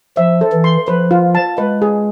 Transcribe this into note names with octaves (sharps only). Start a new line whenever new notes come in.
F3 E5
A4
E3
C6
F3 B4
F4
A5
G#3 B4
G#4